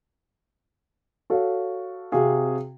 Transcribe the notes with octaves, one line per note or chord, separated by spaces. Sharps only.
F#4 A4 C#5 F5
C3 C4 F#4 G#4 F5